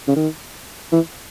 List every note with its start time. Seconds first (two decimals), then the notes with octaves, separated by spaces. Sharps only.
0.07 C#3
0.16 D#3
0.92 E3